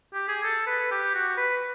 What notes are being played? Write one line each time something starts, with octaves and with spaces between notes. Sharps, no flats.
G4
G#4
A4
B4
G4
F#4
B4